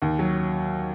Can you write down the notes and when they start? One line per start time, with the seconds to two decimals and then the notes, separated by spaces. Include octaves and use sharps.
0.02 D#2
0.19 F#3